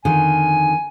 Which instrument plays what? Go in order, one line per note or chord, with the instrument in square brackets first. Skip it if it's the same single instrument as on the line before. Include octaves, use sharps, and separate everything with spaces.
[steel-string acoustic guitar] F2 D3 D#3 [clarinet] G#5